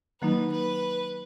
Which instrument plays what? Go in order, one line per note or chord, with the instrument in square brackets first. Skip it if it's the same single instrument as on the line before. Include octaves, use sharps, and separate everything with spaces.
[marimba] D#3 F#3 A#3 D#4 [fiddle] B4
[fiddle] B4